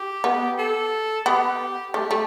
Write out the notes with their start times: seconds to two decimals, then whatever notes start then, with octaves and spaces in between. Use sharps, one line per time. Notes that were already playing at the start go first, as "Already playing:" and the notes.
Already playing: G4
0.24 B3
0.58 A4
1.26 B3 G4
1.94 A3 G4
2.11 A3